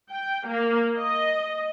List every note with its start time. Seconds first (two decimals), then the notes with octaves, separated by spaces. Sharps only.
0.11 G5
0.47 A#3
0.97 D#5